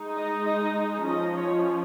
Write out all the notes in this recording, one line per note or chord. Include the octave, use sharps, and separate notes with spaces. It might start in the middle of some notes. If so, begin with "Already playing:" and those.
Already playing: G#3 D#4
D#5
D#5
F3 C#4 D#5
C#5